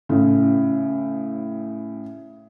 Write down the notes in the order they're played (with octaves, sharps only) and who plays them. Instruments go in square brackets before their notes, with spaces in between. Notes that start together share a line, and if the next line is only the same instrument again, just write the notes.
[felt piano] A2 C#3